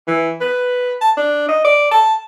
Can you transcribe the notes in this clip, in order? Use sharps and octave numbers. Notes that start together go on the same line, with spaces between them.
E3
B4
A5
D4
D#5
D5
A5